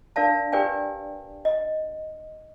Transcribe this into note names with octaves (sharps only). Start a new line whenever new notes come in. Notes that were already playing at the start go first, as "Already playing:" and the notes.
D4 A#4 D5 F5 A5
G4 A#4 B4 D5 G5 G#5
D#5